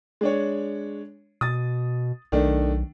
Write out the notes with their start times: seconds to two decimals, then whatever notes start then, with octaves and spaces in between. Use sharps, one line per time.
0.21 G#3 D4 C#5
1.41 B2 D#6 A6
2.32 B1 D#3 A3 D4